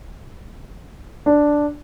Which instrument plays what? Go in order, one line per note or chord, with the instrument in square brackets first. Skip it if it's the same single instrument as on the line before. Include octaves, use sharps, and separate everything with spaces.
[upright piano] D4